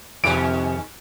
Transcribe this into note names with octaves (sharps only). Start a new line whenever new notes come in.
F2 C3 D#3 G#3 C#4 D7